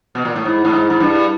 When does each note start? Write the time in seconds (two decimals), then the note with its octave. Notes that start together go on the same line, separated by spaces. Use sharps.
0.15 B2
0.25 A#2
0.36 A2
0.45 G#2 E4
0.65 A2
0.73 G#2
0.90 G#2
1.00 G2